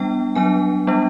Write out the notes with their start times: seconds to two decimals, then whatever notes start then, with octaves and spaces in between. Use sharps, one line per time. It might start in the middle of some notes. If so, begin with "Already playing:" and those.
Already playing: G3 B3 D4 G5
0.35 F#3 B3 D4 G#5
0.87 G3 B3 D4